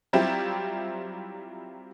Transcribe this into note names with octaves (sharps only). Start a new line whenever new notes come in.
F#3 G3 C4 E4 F4 G4